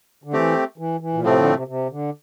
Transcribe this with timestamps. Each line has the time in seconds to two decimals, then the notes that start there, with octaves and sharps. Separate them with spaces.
0.24 D3
0.33 E3 A3 C4 G4
0.78 E3
1.00 E3
1.14 A#2
1.22 A2 C3 F3 A3 C4
1.37 D3
1.52 C3
1.68 C3
1.90 D3